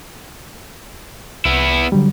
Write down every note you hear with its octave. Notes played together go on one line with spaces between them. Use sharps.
C2 B3 E4
D3 F#3 G3